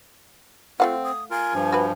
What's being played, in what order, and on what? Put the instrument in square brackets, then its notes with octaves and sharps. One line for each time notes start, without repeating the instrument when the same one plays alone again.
[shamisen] A3 F5 F#5 [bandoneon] C4 [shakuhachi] F4
[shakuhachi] D#6
[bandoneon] F4 A#4 [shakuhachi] G#5
[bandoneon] G2 F3
[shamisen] F#4 B4